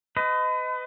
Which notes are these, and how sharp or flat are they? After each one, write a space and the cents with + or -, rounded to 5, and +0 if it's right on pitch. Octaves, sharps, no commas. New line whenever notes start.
B4 +40 D#5 +5